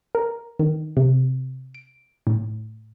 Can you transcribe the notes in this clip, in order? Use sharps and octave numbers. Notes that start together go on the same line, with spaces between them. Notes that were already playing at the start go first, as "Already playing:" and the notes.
A#4
D#3
C3
D7
A2